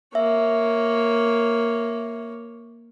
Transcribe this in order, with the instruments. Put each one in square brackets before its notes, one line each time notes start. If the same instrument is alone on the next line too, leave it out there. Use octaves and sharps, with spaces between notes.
[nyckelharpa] A#3 C#5 [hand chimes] E5